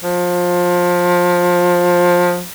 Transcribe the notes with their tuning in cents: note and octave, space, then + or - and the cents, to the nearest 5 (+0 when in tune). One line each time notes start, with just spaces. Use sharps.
F3 +20